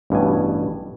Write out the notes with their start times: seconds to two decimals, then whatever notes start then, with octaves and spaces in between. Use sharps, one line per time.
0.10 A1 G2 B2 G#5